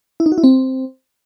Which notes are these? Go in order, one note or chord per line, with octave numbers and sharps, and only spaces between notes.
E4
D#4
F#4
E4
C4